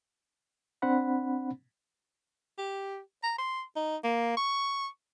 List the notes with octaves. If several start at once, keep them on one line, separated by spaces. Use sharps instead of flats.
C4 D4 C5 F#5 B5
G4
A#5
C6
D#4
A#3
C#6